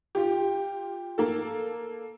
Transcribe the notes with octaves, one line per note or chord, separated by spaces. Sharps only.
F4 G4
A#3 A4